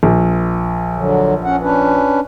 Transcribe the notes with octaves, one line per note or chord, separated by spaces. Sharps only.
A#1
D3 F#3
C#4 F#5
C#4 D4 B4